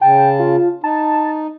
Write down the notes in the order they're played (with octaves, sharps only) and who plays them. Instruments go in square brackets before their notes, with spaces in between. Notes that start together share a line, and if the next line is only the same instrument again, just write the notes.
[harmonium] C#3 A5 [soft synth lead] G5
[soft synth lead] F4
[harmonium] D#4 [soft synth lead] A5